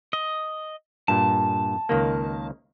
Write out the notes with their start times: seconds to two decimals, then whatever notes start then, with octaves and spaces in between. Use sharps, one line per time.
0.13 D#5
1.08 G2 A#2 A5
1.89 C#2 D#3 A#3